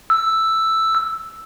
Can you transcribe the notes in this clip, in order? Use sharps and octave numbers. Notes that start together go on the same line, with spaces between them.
E6